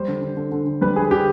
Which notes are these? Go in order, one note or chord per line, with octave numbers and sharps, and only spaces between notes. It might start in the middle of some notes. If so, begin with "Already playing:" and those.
Already playing: G3 C5
D3
D3
D3
D3
D3
G3 B4
D3 G#4
D3 G4